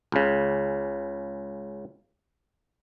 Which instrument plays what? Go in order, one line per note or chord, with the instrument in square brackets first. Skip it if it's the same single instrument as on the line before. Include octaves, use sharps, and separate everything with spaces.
[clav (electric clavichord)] C#2 C#3